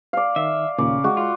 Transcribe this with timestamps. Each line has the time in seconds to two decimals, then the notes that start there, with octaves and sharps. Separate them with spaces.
0.13 D5 F5
0.36 D#3 E5
0.78 D#2 A#2 C#3 D5
1.04 G#3 F#4
1.17 F4